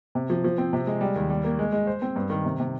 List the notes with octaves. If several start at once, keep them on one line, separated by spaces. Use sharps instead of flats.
C3
F3
F3
C4
C3
G#3
G3
D#2
G3
A#3
G#3
G#3
C5
C4
G2
D#3
C3
C3